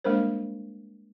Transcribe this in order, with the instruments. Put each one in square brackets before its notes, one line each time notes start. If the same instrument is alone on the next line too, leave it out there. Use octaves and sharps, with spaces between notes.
[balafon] G3 G#3 A#3 D4 A#4 C5